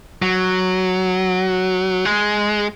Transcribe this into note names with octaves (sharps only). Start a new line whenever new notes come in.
F#3
G#3